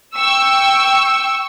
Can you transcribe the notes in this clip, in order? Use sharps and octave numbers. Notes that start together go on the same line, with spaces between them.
G5 C#6 E6